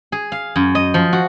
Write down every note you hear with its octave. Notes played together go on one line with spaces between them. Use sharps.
G#4
F5
F#2
D#5
F3
F#4